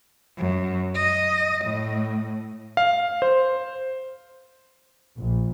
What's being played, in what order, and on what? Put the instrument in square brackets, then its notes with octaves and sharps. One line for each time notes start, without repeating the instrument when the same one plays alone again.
[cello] F#2
D#5
A2
[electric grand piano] F5
C5
[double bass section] A#1